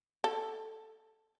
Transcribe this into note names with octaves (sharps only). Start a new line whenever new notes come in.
A4